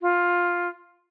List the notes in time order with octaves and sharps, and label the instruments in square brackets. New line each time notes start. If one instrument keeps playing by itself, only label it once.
[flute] F4